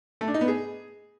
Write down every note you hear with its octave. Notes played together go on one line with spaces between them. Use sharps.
A3
D4
D#4
B3
G#4